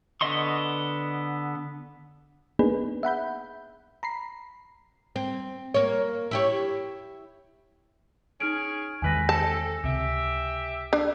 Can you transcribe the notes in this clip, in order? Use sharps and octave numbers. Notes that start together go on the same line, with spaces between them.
D3 B3 D#5 C6 C#6
A#3 B3 D4 D#4 G#4 B4
E5 F#5 B5 G6
A#5 B5 C7
C4
A#3 C#5
E4 G4 C#5
C#4 D#4 G#4 F6 D7
E2 A2 C3 D#3 G#3 B4 G#5 A#6
C4 A4 A5
C#2 C3 G4 E5
D4 E5